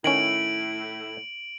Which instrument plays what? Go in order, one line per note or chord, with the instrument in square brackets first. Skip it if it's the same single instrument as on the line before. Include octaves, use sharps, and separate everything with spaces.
[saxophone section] A2 E4 [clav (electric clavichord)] D#3 C#4 [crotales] D7 F#7